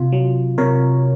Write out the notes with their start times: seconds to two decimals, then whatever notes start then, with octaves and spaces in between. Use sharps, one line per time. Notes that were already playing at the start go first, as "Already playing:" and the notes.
Already playing: C3 F4
0.12 F#3
0.58 C3 A#4 C#5